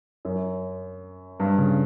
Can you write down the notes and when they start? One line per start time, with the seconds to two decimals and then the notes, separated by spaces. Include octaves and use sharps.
0.25 F#2
1.40 G2
1.58 C#3